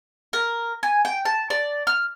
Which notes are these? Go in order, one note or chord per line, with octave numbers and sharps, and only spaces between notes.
A#4
G#5
G5
A5
D5
F6